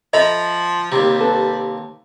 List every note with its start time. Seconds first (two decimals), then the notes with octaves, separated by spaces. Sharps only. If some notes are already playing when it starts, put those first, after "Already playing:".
0.13 F3 A4 D#5 E5 A#5 B5
0.92 D#2 C3 G3
1.20 A4 B4